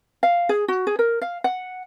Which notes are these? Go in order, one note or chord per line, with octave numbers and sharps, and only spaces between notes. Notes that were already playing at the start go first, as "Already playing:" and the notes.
F5
G#4
F#4
G#4
A#4
F5
F#5